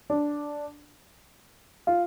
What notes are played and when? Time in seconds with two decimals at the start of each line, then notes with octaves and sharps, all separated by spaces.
0.10 D4
1.87 F4